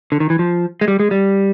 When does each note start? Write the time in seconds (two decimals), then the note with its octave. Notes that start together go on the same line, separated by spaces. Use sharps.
0.12 D3
0.20 D#3
0.30 E3
0.39 F3
0.81 G#3
0.88 G3
1.00 G#3
1.11 G3